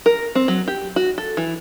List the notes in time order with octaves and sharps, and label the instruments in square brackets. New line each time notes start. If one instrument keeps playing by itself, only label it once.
[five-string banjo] A#4
C4
F#3
G4
F#4
A4
E3